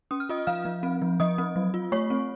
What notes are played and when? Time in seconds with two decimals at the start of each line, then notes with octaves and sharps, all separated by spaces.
0.11 C#4 D#6
0.20 F6
0.29 F4 D#5 D#6
0.47 F3 F5 F6
0.65 F3
0.83 C4
1.02 F3
1.20 F3 D#5 D#6
1.38 C4
1.56 F#3
1.74 F4
1.92 A3 C#5 C#6
2.10 C4